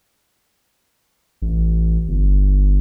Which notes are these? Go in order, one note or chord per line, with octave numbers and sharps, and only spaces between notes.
A1
G1